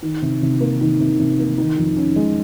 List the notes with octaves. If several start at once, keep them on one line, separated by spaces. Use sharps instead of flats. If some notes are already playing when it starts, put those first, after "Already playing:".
D#3
C3
C3
A#3
D#3
C3
C3
A#3
D#3
F2
C#4
G#3